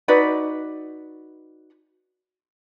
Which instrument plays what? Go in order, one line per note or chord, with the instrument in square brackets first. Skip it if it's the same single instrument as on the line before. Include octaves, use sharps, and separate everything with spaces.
[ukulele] D#4 F#4 B4 D5